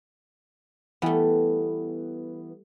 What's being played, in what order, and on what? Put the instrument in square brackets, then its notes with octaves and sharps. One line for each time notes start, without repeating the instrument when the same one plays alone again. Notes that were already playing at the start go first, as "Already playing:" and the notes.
[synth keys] E3 B3 [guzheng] G3 A3